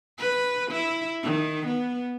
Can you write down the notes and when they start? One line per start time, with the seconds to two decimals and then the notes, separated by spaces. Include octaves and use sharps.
0.18 B4
0.71 E4
1.23 D#3
1.67 B3